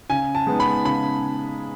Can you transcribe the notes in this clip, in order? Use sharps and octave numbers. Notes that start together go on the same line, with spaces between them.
C#3 G#5
A5
G#3 B3 D#4
B5
C#3 B5